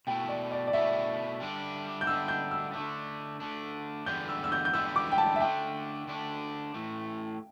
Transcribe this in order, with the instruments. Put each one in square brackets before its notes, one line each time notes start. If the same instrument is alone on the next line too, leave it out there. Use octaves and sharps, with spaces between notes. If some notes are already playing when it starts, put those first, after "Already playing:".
[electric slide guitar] B2 A3 E4 [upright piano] G5
[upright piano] D5
D5
D5
[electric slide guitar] B2 A3 E4 [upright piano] E5
[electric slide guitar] D3 G3 D4
[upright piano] G6
[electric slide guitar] D3 G3 D4 [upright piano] E6
[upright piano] G6
E6
[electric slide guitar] D3 A3 D4
D3 A3 D4
[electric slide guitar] E2 D3 G3 B3 [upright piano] G6
[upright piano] E6
E6
G6
G6
[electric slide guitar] E2 D3 G3 B3 [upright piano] E6
[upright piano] D6
G5
A5
E5
[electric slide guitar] D3 A3 D4 [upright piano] G5
[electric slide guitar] D3 A3 D4
A2 E3 A3